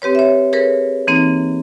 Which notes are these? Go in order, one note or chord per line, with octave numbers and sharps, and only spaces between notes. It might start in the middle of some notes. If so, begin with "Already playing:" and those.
C4 G4 B4 C#5
C#5 E5
G#4 A#4 B4 C#5
E3 A#3 C4 D#4